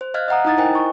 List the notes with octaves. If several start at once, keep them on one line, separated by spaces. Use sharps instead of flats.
C5
D#5 F5 F6 F#6 G#6
D#5 E5 F#5 A#5 D#6
D#4 E4 A#5 D#6 G#6 A6
E4 A#4 C5 D#5 G5 G#5
C#6